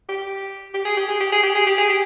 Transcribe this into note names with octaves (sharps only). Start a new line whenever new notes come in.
G4
G4
G#4
G4
G#4
G4
G#4
G4
G#4
G4
G#4
G4